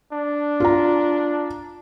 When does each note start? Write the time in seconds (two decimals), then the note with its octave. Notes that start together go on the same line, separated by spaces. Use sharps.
0.13 D4
0.60 F4 A#5